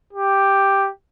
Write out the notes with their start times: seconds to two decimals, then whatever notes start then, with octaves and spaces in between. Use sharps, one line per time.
0.13 G4